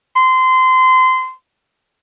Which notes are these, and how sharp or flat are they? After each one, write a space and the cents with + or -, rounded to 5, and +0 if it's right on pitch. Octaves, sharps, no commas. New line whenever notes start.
C6 -25